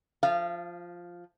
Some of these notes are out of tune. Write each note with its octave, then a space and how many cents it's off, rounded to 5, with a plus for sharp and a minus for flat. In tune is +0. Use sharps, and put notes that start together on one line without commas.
F3 +0 F5 -30